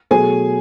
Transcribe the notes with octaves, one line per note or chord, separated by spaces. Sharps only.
B2 F#3 A3 G#4 G#5